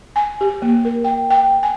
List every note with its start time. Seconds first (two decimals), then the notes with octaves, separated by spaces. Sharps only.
0.16 G#5
0.41 G4
0.62 A#3
0.85 A#4
1.04 G5
1.31 G5
1.63 G#5